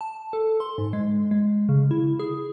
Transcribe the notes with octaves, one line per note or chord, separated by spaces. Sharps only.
A5
A4
C6
G#2
G#3
G#3
C#3
E4
G#4